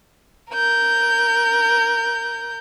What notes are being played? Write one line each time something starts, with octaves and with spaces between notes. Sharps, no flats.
A#4 G6